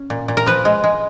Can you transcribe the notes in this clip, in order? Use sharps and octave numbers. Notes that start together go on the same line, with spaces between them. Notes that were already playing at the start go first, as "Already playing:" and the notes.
Already playing: C#4
A#2
A#2
A#4
F3 B4
G#3
G#3